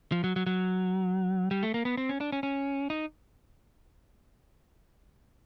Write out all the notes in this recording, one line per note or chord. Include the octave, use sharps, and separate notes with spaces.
F3
F#3
F#3
F#3
G3
A3
A#3
B3
C4
C#4
D4
C#4
C#4
D#4